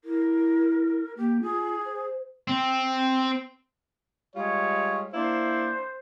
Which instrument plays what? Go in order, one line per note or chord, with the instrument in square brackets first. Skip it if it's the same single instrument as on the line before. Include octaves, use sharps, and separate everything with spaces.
[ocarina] E4 [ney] A#4
[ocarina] A#3 [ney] G4
[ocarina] F4 [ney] G#4
[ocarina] C5
[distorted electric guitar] C4
[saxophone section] G3 G#3 F4 [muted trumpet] C#5
[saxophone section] A#3 D4 E4 [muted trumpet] C5